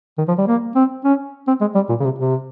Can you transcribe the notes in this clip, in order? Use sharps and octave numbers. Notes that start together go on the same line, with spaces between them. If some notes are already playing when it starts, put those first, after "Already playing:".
D#3
F3
G3
A#3
C4
C#4
C4
G#3
G3
A#2
C#3
C3
C3